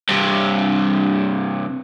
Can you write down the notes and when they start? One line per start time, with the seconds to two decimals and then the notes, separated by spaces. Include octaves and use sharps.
0.09 G2 C3